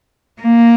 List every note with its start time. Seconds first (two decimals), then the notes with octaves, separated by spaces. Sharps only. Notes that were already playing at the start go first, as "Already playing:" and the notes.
0.42 A#3